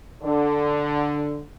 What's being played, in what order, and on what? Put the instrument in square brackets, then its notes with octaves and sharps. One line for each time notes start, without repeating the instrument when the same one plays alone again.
[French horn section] D3